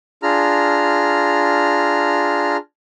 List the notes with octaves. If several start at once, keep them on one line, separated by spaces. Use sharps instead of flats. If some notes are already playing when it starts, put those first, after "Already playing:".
D4 F4 G#4 A#5 F6